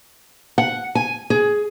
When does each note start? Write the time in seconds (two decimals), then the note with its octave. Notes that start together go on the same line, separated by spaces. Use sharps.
0.58 F#5
0.95 G#5
1.30 G#4